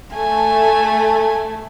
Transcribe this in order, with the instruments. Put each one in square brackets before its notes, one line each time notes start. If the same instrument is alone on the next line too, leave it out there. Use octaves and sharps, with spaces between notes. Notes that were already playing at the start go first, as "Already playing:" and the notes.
[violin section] A3 [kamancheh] G#5